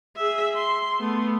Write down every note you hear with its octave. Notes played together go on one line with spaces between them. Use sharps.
G#4 E5
C6
A3 B3